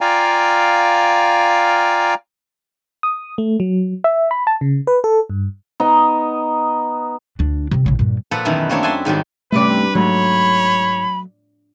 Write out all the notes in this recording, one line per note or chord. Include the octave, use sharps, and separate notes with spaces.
F4 D5 F5 G5 G#5 A#5
D#6
A3
F#3
E5
B5
A5
C#3
B4
A4
G2
B3 D#4 D#5
D2 D4
C3 C4
A#1 C#3
G2 A#2
A#2 F3 A4 B4 F#5
F#2 B2 D#3 E3 E4
A3 A#3 C4 D4 C#5
E5 F#5 G#5 A5 C6
G#2 D#3 F#3 G3
G2 C3 A3 C#4 B4 D5
G#2 F#3 A3 C#5 B5